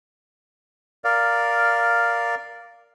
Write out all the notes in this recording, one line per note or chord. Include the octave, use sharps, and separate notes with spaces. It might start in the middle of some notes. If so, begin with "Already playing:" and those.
A#4 D5 F5